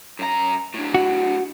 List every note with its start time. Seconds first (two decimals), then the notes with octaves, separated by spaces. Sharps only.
0.19 F#2 A#5
0.74 A2 D4
0.94 F#4